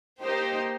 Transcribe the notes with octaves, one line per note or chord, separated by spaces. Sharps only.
A#3 D#4 G4 C5